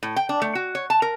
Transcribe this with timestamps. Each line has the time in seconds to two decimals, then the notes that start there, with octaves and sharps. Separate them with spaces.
0.03 A2
0.16 G5
0.29 D4
0.42 A3
0.55 F#4
0.75 C#5
0.90 A5
1.02 A#4